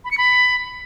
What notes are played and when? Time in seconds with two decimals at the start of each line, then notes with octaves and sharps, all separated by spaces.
0.05 B5
0.11 C#7
0.18 B5